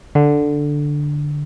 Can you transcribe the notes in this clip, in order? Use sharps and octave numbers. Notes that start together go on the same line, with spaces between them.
D3